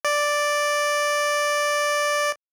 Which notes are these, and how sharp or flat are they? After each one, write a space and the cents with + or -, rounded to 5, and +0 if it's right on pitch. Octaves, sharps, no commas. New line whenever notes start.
D5 +0